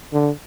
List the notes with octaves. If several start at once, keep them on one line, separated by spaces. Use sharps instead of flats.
D3